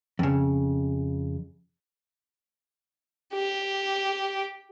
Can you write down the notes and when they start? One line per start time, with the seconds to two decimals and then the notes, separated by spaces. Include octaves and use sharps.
0.19 F2 C#3
3.34 G4